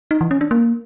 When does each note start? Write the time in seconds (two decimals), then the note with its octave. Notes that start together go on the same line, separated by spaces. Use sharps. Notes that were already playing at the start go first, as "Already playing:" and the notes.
0.11 D#4
0.21 E3
0.31 C#4
0.41 D4
0.51 A#3